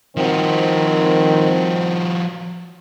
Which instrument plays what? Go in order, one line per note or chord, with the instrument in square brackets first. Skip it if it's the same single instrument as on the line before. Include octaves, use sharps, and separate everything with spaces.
[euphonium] D#3 [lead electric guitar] F3 F#4 [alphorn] C4